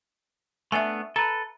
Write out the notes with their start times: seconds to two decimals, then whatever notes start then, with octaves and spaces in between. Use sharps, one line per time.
0.72 A3 B3 D4 E5 G#5
1.16 A4 B4 A#5